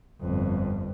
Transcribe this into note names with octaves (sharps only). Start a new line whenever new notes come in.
G1 F2